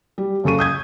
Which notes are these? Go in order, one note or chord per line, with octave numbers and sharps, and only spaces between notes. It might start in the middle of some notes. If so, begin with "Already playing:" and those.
G3
F#2 C#3 A4 C#6 D#7
D#6 G6 G#6